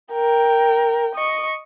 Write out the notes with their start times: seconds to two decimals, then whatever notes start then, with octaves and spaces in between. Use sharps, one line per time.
0.12 A#4 G5
1.15 D#5 C#6